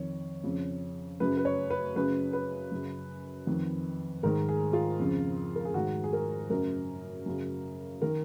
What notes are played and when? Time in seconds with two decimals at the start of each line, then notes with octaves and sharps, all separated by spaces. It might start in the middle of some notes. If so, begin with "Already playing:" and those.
Already playing: F2 D#3 C#5
0.44 F2 C#3
1.20 F#2 C#3 B4
1.37 B4
1.45 C#5
1.70 B4
1.96 F#2 C#3 B4
2.33 B4
2.72 F#2 C#3
3.47 F2 D#3
4.23 G#2 D#3 A#4
4.49 G#4
4.73 F4
4.99 F2 C#3
5.55 A#4
5.65 G#4
5.74 G#2 D#3 F#4
6.04 G#4
6.13 A#4
6.50 F#2 C#3 A#4
7.26 F#2 C#3
8.02 D#3 A#4